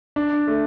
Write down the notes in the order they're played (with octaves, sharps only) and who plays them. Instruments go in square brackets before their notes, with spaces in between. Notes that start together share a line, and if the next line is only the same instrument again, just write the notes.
[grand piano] D4
A3